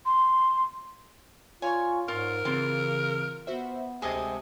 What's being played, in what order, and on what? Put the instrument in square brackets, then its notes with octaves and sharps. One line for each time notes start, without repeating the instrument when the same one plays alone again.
[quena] C6
[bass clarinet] F4 [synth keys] C#5 D5 C#6 [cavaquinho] G#5
[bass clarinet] G#2 [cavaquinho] F4 [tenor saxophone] A#4
[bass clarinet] C#3 [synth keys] E3 C4 D7 [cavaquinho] F4
[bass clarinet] B3 [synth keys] F#4 C5 E5
[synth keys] D2 G#3 [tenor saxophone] C3 [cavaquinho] G#4 D#5 A5